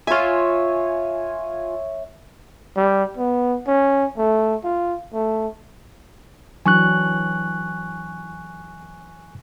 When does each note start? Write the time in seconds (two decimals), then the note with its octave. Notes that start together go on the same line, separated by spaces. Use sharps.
0.07 F4 C#5 E5 G#5
2.77 G3
3.17 B3
3.67 C#4
4.17 A3
4.64 F4
5.13 A3
6.66 E3 F#3 D4 G#5 C#6 F#6